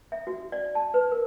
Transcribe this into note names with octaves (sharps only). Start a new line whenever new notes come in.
E5
F#4
D5
A5
B4
A#4